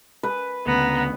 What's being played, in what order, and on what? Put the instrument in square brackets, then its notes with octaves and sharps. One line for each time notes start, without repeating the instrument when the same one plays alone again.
[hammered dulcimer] B4
[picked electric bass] D2 C#3 [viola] B3 [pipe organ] F#5 A#5